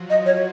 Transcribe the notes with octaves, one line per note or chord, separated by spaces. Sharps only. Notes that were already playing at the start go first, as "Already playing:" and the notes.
Already playing: F3 F#3 F4 F#4
D#5
C#5